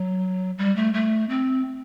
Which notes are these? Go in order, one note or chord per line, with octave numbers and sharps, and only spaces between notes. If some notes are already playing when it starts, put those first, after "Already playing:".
Already playing: F#3
G3
A3
A3
C4